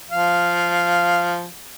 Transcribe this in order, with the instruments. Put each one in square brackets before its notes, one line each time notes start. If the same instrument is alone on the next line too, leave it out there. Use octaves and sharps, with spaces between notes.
[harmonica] F3 F5